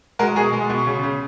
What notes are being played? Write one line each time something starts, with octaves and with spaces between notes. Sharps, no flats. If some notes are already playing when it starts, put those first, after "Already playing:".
G#3 F#4 A#4
B2 G#4
G#3
B2
C#3
C#3